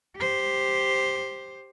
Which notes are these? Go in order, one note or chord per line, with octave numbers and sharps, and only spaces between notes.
G4 C5